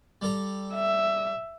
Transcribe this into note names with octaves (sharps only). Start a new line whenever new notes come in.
G3 A4 A#5
E5